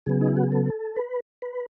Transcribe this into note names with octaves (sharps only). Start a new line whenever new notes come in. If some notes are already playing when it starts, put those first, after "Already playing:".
C#3 F#3 B3 G#4
D#4
E4
F#4
G#4
A4
B4
B4